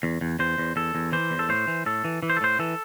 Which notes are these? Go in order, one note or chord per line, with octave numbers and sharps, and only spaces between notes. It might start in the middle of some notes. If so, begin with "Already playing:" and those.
E2
E2
E2 C5
E2
E2 A4
E2
E3 C5
E2
A4
A2 C5
E3
A2 A4
E3
E3
C5
A4
A2 C5
E3 A4